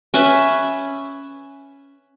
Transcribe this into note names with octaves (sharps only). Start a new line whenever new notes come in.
C#4 B4 E5